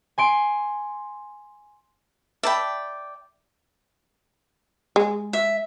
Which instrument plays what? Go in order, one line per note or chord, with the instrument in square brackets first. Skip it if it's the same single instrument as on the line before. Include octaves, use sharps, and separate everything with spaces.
[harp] G#5 C6 D7
[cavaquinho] D5 G5 [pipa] E5 A5 B5
[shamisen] G#3
[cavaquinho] E5